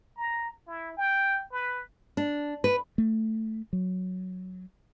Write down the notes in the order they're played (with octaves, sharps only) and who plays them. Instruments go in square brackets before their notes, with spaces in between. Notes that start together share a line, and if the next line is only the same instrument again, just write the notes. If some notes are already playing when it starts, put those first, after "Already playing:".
[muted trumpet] A#5
E4
G5
B4
[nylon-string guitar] D4
B4
[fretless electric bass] A3
F#3